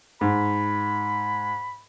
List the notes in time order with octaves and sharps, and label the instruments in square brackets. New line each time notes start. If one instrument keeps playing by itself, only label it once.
[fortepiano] G#2 [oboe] B5